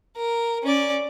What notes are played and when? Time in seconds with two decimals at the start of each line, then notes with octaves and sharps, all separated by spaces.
0.16 A#4
0.63 C#4 D5